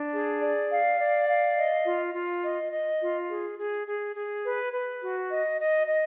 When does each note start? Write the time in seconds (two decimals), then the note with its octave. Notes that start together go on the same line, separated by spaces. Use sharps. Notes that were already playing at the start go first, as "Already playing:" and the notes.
Already playing: D4
0.13 G#4
0.42 D5
0.70 F5
0.99 D5
1.28 F5
1.57 D#5
1.86 F4
2.14 F4
2.43 D#5
2.72 D#5
3.00 F4
3.29 G#4
3.58 G#4
3.87 G#4
4.16 G#4
4.45 B4
4.73 B4
5.02 F#4
5.31 D#5
5.60 D#5
5.88 D#5